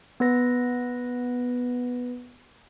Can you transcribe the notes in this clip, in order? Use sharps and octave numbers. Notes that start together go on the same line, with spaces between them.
B3 B4 A#6